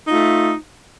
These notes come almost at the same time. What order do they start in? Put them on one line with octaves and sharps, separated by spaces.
D#4 F4 A3